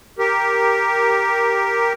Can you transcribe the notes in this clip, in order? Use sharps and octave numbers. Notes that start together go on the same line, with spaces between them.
G4 A#4